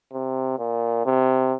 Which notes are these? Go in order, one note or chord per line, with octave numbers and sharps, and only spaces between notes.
C3
A#2
C3